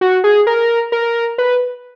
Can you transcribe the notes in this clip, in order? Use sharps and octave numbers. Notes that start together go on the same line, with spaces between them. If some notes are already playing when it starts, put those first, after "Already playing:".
F#4
G#4
A#4
A#4
B4